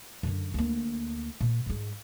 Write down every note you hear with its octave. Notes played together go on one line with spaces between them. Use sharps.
F#2 D3
D2 A#3
A#2
G#2 G#3